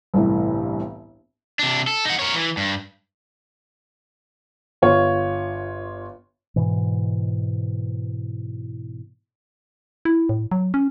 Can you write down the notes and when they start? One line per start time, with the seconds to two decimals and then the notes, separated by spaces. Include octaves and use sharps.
0.14 G1 C2 A2 E3
1.59 C3 D4
1.87 A4
2.05 D#4 F#5
2.19 A#4 C#5
2.35 E3
2.57 G2
4.82 G1 F4 C#5
6.56 G#2 B2 E3
10.05 E4
10.29 A2
10.52 F#3
10.74 C#4